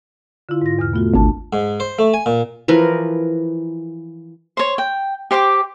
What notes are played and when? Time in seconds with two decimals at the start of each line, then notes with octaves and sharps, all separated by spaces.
0.49 D3 E4 F4
0.61 G#2 A#6
0.79 E2 B2 F6
0.93 A3 B3 F4 F#4
1.14 G#1 D2 D4 A5
1.53 G#2
1.80 C5
1.99 A3
2.14 G#5
2.26 A#2
2.68 E3 F3 A#4 B4
4.57 C5 C#5
4.78 G5
5.31 G4 C5 G5 D6